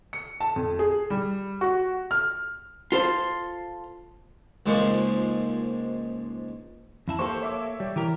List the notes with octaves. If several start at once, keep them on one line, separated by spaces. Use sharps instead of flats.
C#7
A5
F2
G#4
G3
F#4
F6
F4 A4 C5
C#2 G#2 F3 A#3 C#4
F2 E4 A5
A#3 G4 A4 C5 C#6
C#5 E5 D6
G3
E3 G4 A#4